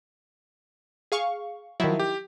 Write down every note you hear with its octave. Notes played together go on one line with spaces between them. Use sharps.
G#4 F5 C#6
D#3 F3 F#3 E4
G4